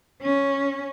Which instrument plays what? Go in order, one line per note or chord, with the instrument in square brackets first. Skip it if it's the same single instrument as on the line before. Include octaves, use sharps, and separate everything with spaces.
[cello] C#4